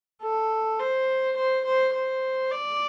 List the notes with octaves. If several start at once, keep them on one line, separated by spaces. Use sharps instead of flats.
A4
C5
C5
C5
C5
D5